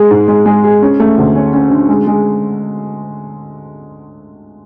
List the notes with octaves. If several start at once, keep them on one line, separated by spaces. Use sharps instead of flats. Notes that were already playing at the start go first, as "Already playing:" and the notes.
Already playing: G#3 G#4
G#2
G#3
G#3
G#4
C#4
A3
D2
C#4
C#4
D3
G#3
G#3